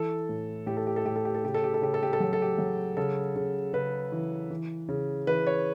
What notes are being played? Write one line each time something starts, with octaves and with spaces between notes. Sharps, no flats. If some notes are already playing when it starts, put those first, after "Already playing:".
Already playing: E3 A4
A2
A2 G4
A4
G4
A4
A2 G4
A4
G4
A4
C#3 G4
A4
G4
A4
C#3 G4
A4
G4
A4
F#3 G4
A4
G4
F#3
C#3 A4
C#3
C#3 B4
E3
E3
C#3
E3 B4
C#5